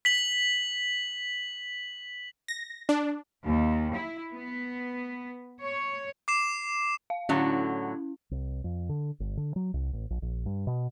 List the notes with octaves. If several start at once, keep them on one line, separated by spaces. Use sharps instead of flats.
B6 F#7
A#6
D4
D#2
E4
B3
C#5
D6 C7 E7
F5
A2 D3 F#3 C#4 E4
C2
F2
D3
G1
D3
F#3
C2
A1
A#1
A#1
G2
B2